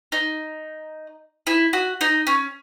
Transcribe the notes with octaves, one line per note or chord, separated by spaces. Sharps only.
D#4
E4
F#4
D#4
C#4